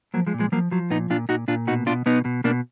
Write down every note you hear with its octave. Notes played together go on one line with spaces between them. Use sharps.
F3 F#3 A#3
F3 G#3
A#2
F3 G#3
F3 F#3 A#3
F3 F#3
A#2 B3 D#4
A#2 D4 F4
A#2 D#4 F#4
A#2 D4 F4
B2 D#4 F#4
B2 D4 F4
B2 B3 D#4
B2
B2 A#3 D4